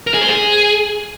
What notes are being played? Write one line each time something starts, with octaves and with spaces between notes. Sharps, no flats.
A#4
G#4
C5
G#4